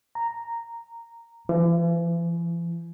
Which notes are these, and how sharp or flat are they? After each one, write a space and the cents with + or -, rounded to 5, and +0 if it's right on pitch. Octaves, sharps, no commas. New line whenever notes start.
A#5 -10
E3 +45